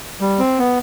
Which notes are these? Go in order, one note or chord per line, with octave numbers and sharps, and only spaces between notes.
G3
C4
B3